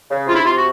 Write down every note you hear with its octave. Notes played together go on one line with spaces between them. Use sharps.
C#3
C3 F4
E4
C3 F4
F#4